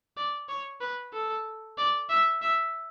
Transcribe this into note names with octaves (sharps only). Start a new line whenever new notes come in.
D5
C#5
B4
A4
D5
E5
E5